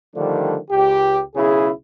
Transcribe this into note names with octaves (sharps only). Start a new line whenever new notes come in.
D3 D#3 F3 G3 A3 D4
C#2 G4
B1 C#3 E4 G#4